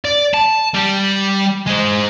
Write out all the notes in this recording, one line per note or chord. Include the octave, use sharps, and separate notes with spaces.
D5
A5
G3
G#3 C5